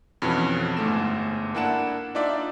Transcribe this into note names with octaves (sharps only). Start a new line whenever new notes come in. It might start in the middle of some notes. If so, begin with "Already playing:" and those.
F2 B2 E3 C#4
G1 G#2 A3 E7
A#3 D4 E4 F#5 A5 E7
D4 D#4 F4 D5 E5